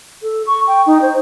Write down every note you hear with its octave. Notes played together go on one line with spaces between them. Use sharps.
A4
C#6
G5
D#4
C5